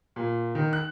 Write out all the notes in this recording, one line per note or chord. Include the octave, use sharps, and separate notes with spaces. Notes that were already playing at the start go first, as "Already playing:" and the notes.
A#2
D#3
F#6